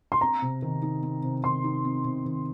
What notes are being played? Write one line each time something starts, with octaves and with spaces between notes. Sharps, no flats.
C6
C4 A#5
C3
D#3
D#4
C4
C3
D#3 C6
D#4
C4
C3
D#3